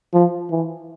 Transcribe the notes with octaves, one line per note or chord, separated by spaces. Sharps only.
F3
E3